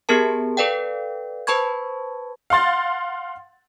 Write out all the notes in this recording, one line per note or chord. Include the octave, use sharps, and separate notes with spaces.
B3 G4 G#4 A#4 A5
A4 B4 D5 F5 G5
B4 C5 A5 B5 C#6 G#6
F5 F#5 C6 A6